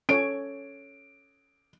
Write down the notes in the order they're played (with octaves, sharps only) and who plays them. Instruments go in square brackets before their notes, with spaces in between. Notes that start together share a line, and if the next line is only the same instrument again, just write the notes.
[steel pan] C#4 A4 C#5 [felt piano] D7